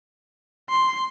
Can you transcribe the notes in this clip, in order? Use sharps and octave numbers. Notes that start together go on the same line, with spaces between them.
C6